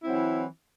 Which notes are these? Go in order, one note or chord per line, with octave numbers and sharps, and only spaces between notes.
E3 F#3 C4 E4